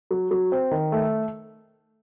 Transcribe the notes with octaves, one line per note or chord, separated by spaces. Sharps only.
F#3
F#3
C4
D#3
A3